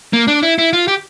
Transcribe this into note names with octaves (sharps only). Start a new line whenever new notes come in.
A#3
D4
E4
E4
F4
G4